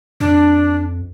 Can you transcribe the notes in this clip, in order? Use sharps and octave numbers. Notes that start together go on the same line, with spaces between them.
F2 D4